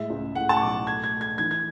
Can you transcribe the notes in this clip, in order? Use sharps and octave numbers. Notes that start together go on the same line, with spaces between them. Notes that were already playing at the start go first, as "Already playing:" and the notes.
Already playing: A2 G#3 E5
C#2
A2 F#5
A5
C#6
B1 D6
A3 G#6
G#6
A3
G#6
E3 G#6
G#6